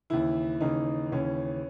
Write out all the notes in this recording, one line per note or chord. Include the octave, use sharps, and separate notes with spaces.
D#2 C#3 E3 E4
D#2 C#3 E3 D#4
D#2 C#3 E3 C#4